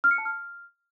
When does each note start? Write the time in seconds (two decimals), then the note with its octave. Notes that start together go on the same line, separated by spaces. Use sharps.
0.04 F6
0.11 C#7
0.18 A5
0.25 F6